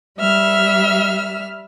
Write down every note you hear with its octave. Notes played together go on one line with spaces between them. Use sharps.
G3 E5 F6